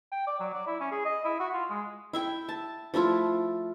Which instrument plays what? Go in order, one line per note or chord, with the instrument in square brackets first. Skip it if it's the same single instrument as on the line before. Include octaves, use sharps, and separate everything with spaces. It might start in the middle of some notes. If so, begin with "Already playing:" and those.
[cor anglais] G5
D5
F#3
D5
E4
C#4
G#4
D#5
E4
F#4
F4
G#3
[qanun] E4 E5 G5
A5
F3 A3 E4 F4